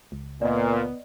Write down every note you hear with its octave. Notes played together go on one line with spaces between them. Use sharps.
C#2
A#2 B3 D5 D#5